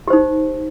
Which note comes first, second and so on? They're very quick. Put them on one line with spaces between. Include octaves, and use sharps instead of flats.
G4 C5 D#4